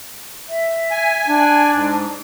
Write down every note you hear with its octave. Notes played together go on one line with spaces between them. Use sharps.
E5
G#5
D4
G#2